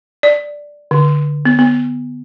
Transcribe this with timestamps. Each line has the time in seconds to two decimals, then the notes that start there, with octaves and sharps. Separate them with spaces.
0.23 D5
0.91 D3
1.45 B3
1.59 B3